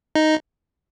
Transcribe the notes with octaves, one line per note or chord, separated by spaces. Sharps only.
D#4